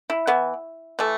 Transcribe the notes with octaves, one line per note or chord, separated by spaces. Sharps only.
E4
E3 B3
E3 A3